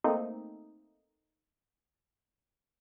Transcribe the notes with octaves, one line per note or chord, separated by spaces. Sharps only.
A3 A#3 C4 D#4